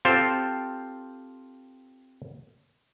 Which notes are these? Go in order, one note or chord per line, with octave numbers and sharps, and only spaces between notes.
C4 F4 G4 A4 C5 G5